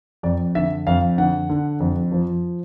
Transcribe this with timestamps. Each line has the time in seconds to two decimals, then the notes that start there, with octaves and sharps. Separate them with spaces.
0.23 F2 D5
0.55 D3 E5
0.87 F2 F5
1.18 D3 F#5
1.50 D3
1.80 F2
2.12 F3